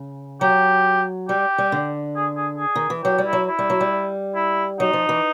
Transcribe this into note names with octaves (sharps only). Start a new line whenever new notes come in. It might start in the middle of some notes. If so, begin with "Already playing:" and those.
Already playing: C#3
F#3 G4
G3 G4
G3
D3
G#4
G#4
G#4
D#3
E3
F#3 G4
G3
E4
F#3
E4
G3
F#3
G3
E4
F#3 D#4
F3
E3